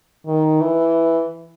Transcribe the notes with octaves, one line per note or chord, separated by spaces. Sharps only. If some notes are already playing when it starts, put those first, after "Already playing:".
D#3
E3